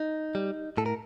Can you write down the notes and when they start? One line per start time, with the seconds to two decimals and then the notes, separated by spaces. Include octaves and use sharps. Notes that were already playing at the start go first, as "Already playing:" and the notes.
Already playing: D#4
0.35 G3
0.77 A2 A4
0.86 A#4